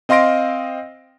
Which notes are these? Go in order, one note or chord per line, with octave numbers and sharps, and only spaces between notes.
C4 D#5 F5 C6 A#6 D7